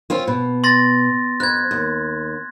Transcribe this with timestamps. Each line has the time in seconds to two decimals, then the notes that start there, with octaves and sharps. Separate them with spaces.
0.10 C4 C#4 F4
0.27 B2
0.64 C6 A6 A#6
1.40 F2 F#6 G#6
1.71 D#2